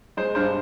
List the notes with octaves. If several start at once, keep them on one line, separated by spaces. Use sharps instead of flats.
G#3 C5
G2 C5